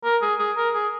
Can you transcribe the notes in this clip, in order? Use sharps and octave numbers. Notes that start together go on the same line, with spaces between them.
A#4
G#4
G#4
A#4
G#4